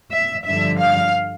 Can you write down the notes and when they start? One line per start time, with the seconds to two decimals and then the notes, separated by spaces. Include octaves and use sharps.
0.12 E5
0.46 G2 D3 F3 E5
0.80 F5